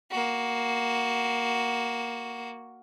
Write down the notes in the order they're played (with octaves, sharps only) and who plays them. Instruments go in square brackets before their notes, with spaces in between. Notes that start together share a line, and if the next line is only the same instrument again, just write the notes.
[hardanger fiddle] A#3 F#4